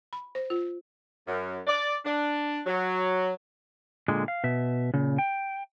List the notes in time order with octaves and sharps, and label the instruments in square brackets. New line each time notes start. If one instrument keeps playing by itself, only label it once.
[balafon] B5
C5
F4
[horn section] F#2
D5
D4
F#3
[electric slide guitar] A#2 D3 G#3
F5
B2 E5
A#2 C#3
G5